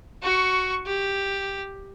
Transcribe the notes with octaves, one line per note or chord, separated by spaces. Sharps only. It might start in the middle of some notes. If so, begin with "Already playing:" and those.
F#4 C#6
G4